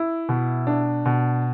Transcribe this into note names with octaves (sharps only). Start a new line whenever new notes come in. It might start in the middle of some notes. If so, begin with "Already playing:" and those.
Already playing: E4
B2
D4
B2